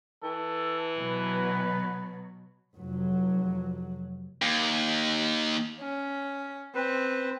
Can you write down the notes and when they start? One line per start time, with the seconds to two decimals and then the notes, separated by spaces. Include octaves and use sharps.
0.23 E3 A4
0.99 B2 F#3 B4
2.74 F1 F#3
4.42 D#2
5.80 C#4
6.75 C4 B4